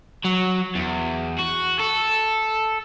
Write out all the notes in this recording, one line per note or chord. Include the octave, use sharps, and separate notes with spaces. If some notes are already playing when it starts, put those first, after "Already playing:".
F#3
E2
F#4
A4